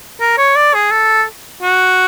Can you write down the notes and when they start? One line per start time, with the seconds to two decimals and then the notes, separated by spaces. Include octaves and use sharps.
0.20 A#4
0.38 C#5
0.56 D5
0.74 G#4
0.91 A4
1.62 F#4